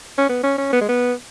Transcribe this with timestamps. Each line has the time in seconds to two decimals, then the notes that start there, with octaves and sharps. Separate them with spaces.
0.18 C#4
0.29 B3
0.43 C#4
0.58 C#4
0.73 B3
0.81 G#3
0.89 B3